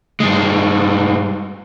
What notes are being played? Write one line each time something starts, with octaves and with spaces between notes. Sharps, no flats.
G2 G#3